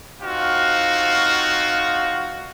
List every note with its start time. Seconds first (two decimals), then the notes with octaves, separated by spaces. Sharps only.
0.21 C4 D#4 F4 F#4 F5